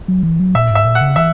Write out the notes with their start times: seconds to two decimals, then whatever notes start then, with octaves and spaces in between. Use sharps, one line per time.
0.08 F#3
0.23 E3
0.40 F#3
0.55 A#2 E5
0.70 G#2 E5
0.85 A#2
0.95 F#5
1.01 C#3
1.16 E3 E5